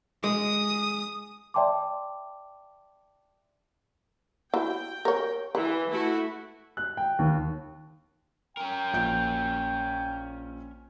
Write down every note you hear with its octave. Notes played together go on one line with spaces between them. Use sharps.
G#3 D#6
D5 E5 G5 A5 C6 D6
E4 F#4 G5
A#4 C#5
E3 B4
A3 E4 F#4
F#6
G5
D#2
C#4 A#4 G5
A#1 G6 D7